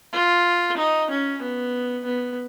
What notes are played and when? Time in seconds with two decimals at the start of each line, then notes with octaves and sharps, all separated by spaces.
0.13 F4
0.77 D#4
1.10 C#4
1.42 B3
2.05 B3